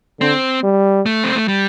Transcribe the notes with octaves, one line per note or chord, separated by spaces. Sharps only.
D3 C4
G3
A3
C4
A3
G3